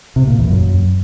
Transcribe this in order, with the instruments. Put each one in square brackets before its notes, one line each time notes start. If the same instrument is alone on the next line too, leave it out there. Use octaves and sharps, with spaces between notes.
[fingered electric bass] C3
A#2
E2
F#2